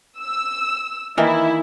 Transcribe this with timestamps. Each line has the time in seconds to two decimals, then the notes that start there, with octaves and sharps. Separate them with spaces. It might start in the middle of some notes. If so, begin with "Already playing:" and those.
0.21 E6
1.17 D#3 E3 A#3 E4